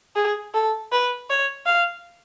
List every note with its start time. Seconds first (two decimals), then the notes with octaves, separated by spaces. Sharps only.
0.16 G#4
0.54 A4
0.92 B4
1.30 C#5
1.66 F5